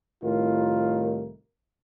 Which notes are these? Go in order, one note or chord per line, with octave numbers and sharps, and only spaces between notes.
C2 A2 D#3 F4 A#4